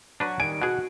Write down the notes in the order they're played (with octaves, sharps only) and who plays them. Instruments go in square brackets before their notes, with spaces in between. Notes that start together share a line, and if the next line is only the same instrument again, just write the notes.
[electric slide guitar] F#3 F#4 [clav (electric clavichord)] D4 B4
[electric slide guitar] D#3 G3 [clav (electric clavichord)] G#5 [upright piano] D7
[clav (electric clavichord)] B2 G#4 [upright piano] F#4 [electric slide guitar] F#5